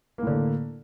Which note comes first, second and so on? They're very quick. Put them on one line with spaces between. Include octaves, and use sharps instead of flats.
A#3 A2 D3